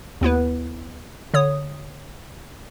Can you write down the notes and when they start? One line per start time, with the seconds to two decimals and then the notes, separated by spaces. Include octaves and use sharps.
0.21 D#2 B3 E4 B4
1.34 D3 C#5 D#6